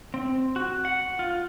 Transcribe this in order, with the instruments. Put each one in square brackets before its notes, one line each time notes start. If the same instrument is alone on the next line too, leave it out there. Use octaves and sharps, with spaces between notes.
[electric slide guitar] C4
F#4
F#5
F4